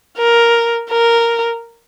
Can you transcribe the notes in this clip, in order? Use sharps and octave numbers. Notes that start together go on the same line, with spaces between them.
A#4
A#4